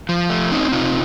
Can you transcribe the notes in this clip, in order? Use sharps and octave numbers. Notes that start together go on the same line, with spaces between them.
F3
A3
C4 C#4 D#4
C3 D#4 F4